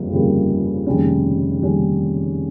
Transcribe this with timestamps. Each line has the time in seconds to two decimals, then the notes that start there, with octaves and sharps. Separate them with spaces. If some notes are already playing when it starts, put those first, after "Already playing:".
Already playing: G1 F2 C#3 G3 A#3
0.11 G1 F2 C#3 G3 A#3
0.86 F1 D#2 C#3 G3 C#4
1.61 F1 D#2 C#3 G3 C#4